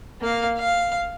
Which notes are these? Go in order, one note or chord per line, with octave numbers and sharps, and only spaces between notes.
A#3 F5
F5